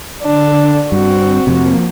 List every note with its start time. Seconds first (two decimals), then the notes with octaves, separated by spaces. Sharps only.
0.23 D3 D4
0.92 G2 C4 F#4
1.47 F2 C3 F3 A#3